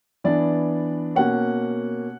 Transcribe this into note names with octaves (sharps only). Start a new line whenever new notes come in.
E3 B3 D4 D5
B2 A#3 C#4 F#5